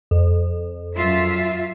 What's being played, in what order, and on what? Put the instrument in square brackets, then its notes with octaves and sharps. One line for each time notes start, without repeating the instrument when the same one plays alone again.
[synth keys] F2
[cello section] F#2 F4 E5